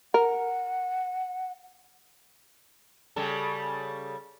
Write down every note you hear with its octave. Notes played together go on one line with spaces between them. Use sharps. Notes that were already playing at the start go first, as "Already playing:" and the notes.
A#4 F#5
C#3 G3 A4